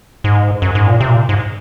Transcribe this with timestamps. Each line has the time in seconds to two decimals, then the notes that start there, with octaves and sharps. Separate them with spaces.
0.24 G#2
0.62 F#2
0.75 G#2
0.87 A#2
1.00 C3
1.10 A#2
1.29 G#2